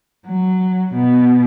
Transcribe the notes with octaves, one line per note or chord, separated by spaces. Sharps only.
F#3
B2